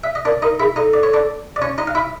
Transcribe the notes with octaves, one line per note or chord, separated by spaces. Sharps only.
E5
D#5
D4 A#4 D5
D#4 A#4 D#5
E4 G#4 E5
D#4 A4 D#5
D5
C#5
D4 D5
D5
C#4 C#5
D#4 D#5
F5
E4 E5